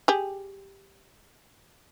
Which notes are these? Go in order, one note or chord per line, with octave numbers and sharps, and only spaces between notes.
G4 G#4